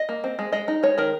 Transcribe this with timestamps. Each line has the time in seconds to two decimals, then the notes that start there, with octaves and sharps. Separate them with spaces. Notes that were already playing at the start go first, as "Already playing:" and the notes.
Already playing: D#5
0.09 A#3
0.24 C4
0.39 G#3
0.52 G#3 D#5
0.68 D#4
0.83 G#3 C#5
0.98 D#3 A#4